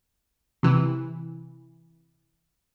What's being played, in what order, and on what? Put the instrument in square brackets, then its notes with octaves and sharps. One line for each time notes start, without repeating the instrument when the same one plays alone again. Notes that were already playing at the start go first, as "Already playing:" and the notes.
[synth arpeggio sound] C3 E3